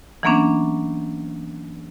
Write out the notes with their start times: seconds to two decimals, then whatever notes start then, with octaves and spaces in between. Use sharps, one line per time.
0.23 E3 F#3 A#3 B3 C#4 D4